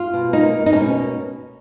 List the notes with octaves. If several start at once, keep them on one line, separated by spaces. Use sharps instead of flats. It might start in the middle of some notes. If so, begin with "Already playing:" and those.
Already playing: F4
B2
A#3 D#4
A#3
D#4
B2 C#4
A#3